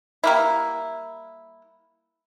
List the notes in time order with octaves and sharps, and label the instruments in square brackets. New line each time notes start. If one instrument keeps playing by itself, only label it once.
[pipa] G3 A#3 E4